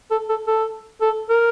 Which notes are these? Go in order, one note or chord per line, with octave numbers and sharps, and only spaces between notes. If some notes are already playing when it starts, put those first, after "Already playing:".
A4
A4
A4
A4
A#4